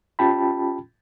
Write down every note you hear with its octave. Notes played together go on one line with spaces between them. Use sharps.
C#4 F4 G4 G5 A5 B5